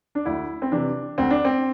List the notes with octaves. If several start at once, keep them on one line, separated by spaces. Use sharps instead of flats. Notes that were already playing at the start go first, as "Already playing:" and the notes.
D4
D2 E4
C4
C3 E3 D4
D2 C4
D4
C4